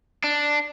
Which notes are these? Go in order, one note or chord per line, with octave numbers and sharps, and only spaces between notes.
D4